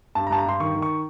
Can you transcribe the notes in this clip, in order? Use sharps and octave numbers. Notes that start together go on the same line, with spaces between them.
G2 A5
A#5
G2 A5
A#5
G2 C6
D#3 C#6
D#3
C#6